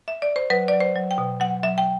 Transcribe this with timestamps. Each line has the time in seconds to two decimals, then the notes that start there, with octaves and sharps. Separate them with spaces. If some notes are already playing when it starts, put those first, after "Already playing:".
0.08 E5
0.22 D5
0.36 C5
0.50 F#3 B4
0.68 F#3 D5
0.80 C5
0.96 F#3
1.11 G5
1.18 B2
1.40 F#3 F#5
1.63 F#3 E5
1.78 G5